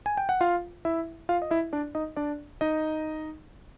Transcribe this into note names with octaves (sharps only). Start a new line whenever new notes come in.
G#5
G5
F#5
F4 F5
E4 E5
F4 F5
D#5
E4 E5
D4 D5
D#4 D#5
D4 D5
D#4 D#5